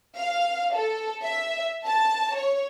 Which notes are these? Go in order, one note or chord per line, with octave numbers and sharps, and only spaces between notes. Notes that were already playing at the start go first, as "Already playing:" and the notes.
F5
A4
E5
A5
C#5